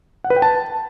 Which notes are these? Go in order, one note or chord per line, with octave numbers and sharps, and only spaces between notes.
F#5
B4
G5
A5